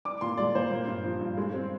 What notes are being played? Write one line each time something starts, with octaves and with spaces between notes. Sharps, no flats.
D4 D6
A#2 C6
G#3 D5
A#2 C5
A#3
G2
F3
G2
G#3
C4